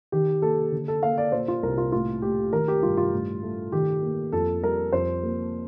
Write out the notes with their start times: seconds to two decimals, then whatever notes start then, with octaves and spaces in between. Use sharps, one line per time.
0.12 D#3 G4
0.42 A#3 A4
0.72 D3
0.88 A4
1.03 A#3 F5
1.18 D5
1.32 A#2 C5
1.48 F4
1.63 C2 A#4
1.78 F4
1.92 A2 F4
2.22 A3 G4
2.53 D#3 A#4
2.68 G4
2.83 G2 F4
2.97 F4
3.12 A2
3.43 A3
3.72 D#3 G4
4.02 A#3
4.32 F2 A4
4.62 G3 A#4
4.93 F2 C5
5.23 A#3